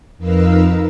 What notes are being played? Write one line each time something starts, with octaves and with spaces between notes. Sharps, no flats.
F2 D#4 A#4 B4 F5 E6